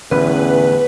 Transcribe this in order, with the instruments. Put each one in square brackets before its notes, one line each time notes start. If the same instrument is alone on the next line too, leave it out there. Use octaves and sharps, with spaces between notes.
[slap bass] A1 D3 C#4 [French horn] E2 [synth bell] B4